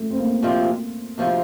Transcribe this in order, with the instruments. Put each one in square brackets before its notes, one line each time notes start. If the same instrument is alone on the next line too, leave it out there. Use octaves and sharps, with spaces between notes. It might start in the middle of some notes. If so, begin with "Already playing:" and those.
Already playing: [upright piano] A3
C4
A#3
[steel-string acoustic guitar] D2 C3 F3 C4 F4
D2 C3 F3 C4 F4